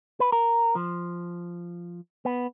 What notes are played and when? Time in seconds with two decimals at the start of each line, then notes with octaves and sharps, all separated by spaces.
0.20 B4
0.32 A#4
0.75 F3
2.25 B3